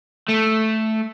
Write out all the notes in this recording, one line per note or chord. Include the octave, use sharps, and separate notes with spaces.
A3